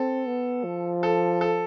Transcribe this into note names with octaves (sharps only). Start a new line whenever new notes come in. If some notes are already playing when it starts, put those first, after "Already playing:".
Already playing: C4 A4
B3
F3
A4
A4